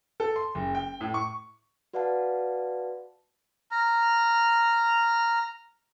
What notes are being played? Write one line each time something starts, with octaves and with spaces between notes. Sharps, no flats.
A4
C6
F#1
G5
A2
C#6
F#4 B4 D5 F5 F#5 A5
A#5 F6